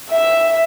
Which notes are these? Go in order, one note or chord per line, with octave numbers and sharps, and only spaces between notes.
E5